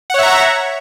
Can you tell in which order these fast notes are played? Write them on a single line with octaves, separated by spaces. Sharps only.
F#5 C#5 E5 A#5 C#6